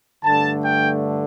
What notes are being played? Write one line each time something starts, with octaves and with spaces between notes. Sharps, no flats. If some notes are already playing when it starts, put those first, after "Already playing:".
G2 D3 A3 A5
G5